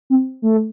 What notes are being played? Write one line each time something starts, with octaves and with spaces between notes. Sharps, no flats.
C4
A3